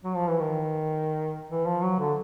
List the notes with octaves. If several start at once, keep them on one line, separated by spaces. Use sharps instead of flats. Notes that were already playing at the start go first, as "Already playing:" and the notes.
F#3
F3
E3
D#3
E3
F3
F#3
D3